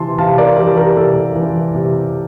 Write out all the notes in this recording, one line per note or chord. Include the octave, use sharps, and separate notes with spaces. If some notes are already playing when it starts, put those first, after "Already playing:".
Already playing: C3 E3 A5 C6
C3 F5 A5
A#4 D5
E3 G4 A#4
G4 A#4
C3 A4
E3
C3